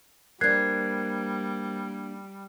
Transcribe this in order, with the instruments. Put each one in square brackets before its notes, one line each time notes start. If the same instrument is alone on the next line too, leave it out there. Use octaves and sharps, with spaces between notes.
[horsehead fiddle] G3 [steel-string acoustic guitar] A#3 D4 [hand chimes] A#4 C5 [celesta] F#6 G#6 C7